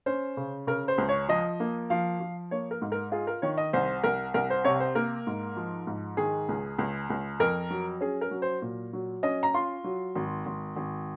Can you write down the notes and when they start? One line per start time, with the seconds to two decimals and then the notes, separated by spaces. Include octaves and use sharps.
0.06 C#4 C5
0.37 C#3
0.67 C#3 A#4
0.88 C5
0.98 C#2
1.09 C#5
1.28 F3 D#5
1.60 A#3
1.90 F3 F5
2.20 F3
2.51 A#3 C#5
2.71 A#4
2.82 G#2
2.92 A#4
3.12 F4 G#4
3.27 A#4
3.42 D#3 C#5
3.57 D#5
3.73 C2 C5
4.03 C2 A#4
4.34 C2 A#4
4.50 C5
4.65 C3 C#5
4.80 C5
4.95 A#3 A#4
5.27 G#2
5.56 F3
5.87 G#2
6.17 D#3 G#4
6.49 C#2
6.78 C#2
7.10 C#2
7.40 F2 A#4
7.70 F#3
8.00 C#4 G#4
8.21 A#4
8.31 F#3
8.42 C5
8.62 A#2
8.93 F#3
9.23 C#4 D#5
9.43 A#5
9.54 F4 C6
9.84 F#3
10.15 G#1
10.46 G#1
10.76 G#1